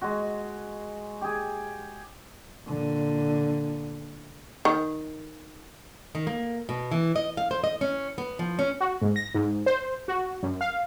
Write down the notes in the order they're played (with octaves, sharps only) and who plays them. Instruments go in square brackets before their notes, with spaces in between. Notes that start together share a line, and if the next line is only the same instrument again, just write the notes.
[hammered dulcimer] G#3 F#4
G4 G#4
[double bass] A#2 D3
[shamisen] D#3
[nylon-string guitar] D#3
A#3
B2
E3
D#5
F5
C5
D#5
C#4
B3
F3
C#4
[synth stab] F#4
G#2
A#6
G#2
C5
F#4
F#2
F5